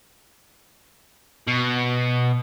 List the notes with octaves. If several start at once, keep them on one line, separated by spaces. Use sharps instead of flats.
B2